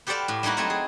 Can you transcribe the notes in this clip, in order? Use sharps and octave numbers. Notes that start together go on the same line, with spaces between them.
B3 G4 A4 C5 D5 F5
A2
G3 A#3 D#4 E4 F#4
F#3 A3 C4 G#5
G#4